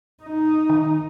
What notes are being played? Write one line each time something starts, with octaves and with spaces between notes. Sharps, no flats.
D#4
D#3